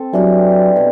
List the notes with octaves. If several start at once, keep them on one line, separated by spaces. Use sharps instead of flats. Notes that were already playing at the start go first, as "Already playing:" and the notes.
Already playing: C4 A4
E3 F#3 G3 D4 G4
B2